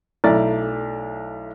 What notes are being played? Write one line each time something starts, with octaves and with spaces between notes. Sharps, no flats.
B1 A3 E4 D5 A#5 A6